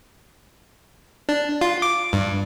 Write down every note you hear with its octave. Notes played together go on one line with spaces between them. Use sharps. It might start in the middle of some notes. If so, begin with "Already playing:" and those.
D4
F4
D6
G2